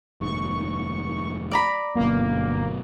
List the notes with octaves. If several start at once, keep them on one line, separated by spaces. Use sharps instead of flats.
F1 D#2 G#2 C#6
D5 A#5 B5
G1 F#2 B2 A#3